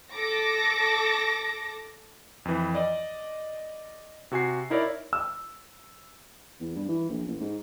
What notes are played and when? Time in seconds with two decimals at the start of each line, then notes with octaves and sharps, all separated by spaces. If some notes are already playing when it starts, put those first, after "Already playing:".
0.12 A4 D6 A#6
2.45 F2 E3
2.75 D5 D#5
4.31 C3 F#4 G#5 C7
4.70 D#4 E4 A#4 C#5 D5 E5
5.13 E6
6.60 E2
6.76 G2
6.89 E3
7.09 A#1
7.27 A1
7.41 G#2